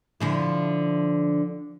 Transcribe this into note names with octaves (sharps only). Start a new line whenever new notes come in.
D3 F3 E4